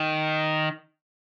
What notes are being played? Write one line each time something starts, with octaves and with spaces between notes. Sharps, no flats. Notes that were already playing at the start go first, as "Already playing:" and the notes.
Already playing: D#3